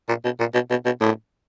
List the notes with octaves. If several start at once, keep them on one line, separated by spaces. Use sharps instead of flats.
A#2
B2
A#2
B2
B2
B2
A2